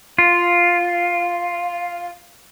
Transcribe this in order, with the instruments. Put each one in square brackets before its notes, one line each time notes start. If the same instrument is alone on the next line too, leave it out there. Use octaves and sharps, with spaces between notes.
[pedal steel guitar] F4 [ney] F5